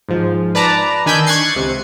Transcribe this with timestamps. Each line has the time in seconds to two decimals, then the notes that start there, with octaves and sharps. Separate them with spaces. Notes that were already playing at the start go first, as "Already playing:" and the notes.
0.09 G#2 F3
0.55 B4 D5 A5 A#5
1.06 D#3 D4 G#5 B5 E6 G6
1.27 C#6 F#6 G#6 A6 C7 C#7
1.55 C#2 C3